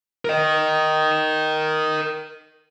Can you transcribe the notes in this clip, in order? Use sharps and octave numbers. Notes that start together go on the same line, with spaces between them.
A#4 D#5